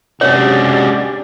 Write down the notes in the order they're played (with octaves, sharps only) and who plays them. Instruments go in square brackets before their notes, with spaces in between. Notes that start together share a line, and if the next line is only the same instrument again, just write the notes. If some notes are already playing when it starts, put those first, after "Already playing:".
[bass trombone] C3 [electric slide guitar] G#3 C#4 F#4 [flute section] D4 G4 G#5 [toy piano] C#5